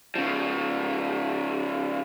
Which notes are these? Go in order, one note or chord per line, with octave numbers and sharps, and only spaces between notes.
C#3 F3